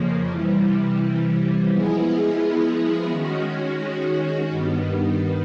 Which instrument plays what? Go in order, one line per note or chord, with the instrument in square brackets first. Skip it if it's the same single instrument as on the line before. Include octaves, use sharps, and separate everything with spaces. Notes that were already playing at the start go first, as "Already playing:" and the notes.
Already playing: [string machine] F2 C#3 F3 A#3
C3 E3 G3
F3 G#3 B3 E4 G#4
D#3 G#3 C#4 F#4
G2 D#3 G3 B3